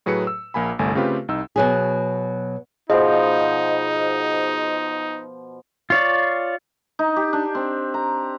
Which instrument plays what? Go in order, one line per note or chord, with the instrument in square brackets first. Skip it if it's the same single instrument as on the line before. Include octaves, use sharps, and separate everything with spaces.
[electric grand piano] A2 F#3 G#4 B4 C#7
E6
A#1 A#3 G#5 B5
G1 C2 A3 G#5
C#3 A3 C4 F4 G4 B4
C2 D#4 E6
[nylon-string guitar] B2 F#3 G#4
[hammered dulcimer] B2 F3 [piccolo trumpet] D#4 [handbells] G#4 C5 [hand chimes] D#5
[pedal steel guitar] F4 C#5 D5
[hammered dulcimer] D#4
G4
D4
C4
A#5